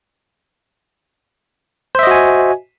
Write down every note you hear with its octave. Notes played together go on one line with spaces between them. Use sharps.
F#4 C5 D#5 E5 G#5